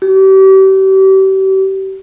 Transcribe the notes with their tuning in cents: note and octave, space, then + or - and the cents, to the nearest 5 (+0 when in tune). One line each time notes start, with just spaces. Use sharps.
G4 -40